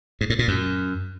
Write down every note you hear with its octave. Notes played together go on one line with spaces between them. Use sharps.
G#2
A2
A#2
F#2